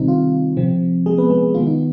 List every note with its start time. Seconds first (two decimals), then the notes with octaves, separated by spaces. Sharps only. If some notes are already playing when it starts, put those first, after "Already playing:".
Already playing: C3 D#3 G3 C4 D#4
0.08 F4
0.57 C3 F3 C4
1.06 G#3 G#4
1.18 B3 B4
1.30 G#3 G#4
1.54 D#3 B3 F4
1.67 D#4